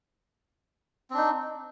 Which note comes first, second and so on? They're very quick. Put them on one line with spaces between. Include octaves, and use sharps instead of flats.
C4 D4 D#4